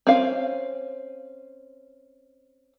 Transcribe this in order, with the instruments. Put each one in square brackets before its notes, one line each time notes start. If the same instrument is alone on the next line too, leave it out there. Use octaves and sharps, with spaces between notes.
[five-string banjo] C4 C#4 F5